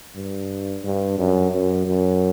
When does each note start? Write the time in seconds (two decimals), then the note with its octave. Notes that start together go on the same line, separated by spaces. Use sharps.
0.15 G2
0.84 G2
1.18 F#2
1.52 F#2
1.87 F#2